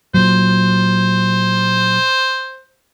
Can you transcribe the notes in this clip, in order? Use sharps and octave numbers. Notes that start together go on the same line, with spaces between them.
A#2 F#3 C5